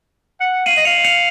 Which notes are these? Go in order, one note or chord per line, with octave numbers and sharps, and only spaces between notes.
F#5
F5 D#7 F#7
D#5 F#7
F5 C#7 F7
C#7 F7